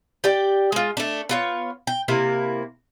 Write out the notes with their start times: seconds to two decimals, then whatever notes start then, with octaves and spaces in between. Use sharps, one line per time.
0.24 G4 D5 G5
0.72 G#3 F4
0.97 A3 D4
1.29 B3 F4 C#5
1.87 G5
2.08 C3 A#3 E4